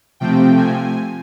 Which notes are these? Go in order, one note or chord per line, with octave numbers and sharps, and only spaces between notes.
C3 F3 A3 C4 G5
G#5